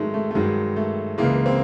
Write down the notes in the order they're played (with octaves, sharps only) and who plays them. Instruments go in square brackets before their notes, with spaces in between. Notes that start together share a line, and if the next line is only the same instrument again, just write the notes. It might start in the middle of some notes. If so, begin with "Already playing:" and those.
Already playing: [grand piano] G#2 D#3 F#3 G#3 A3
A3
A3
G2 D#3 F#3 G#3
A3
C#2 C#3 E3 G#3 A#3
A#3 C4